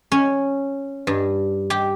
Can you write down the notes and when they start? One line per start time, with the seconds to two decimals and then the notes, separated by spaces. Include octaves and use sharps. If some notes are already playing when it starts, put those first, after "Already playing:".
0.12 C#4
1.07 G2
1.70 G4